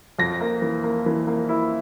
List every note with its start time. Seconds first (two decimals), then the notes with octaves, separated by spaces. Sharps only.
0.19 F2 A#6
0.40 A#3
0.62 E3
0.83 A#3
1.06 E3
1.27 A#3
1.49 E4